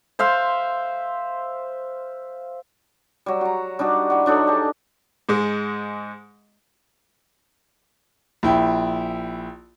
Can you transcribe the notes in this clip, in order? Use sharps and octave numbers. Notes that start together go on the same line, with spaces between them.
C5 E5 F5 C6
F#3 G3
F#4 A#5
G3 D4 D#4 F#4
E4 F#4
F#3 D4 D#4 A4
G4 G#4
G#2 G#3
A#1 E4 G5